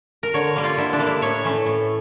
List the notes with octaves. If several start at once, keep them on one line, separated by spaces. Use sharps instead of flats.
A#4
D3 C#5
G3 A#3
F4
D3 E4
D4
G3 A#3
E4
A2 C#5
E3 A3 C#4
A2